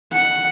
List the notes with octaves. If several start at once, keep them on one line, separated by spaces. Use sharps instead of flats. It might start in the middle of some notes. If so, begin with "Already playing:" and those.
F#5